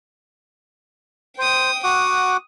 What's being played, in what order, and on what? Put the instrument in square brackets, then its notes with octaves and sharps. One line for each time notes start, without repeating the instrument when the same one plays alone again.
[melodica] C5 [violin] G5 D#6
[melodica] F#4 F#5 D6 [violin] D#6